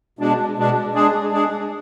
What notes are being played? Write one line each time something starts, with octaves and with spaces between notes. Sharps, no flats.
B2 G#3 D4
B2 G#3 D4
G#3 D4 G#4
G#3 D4 G#4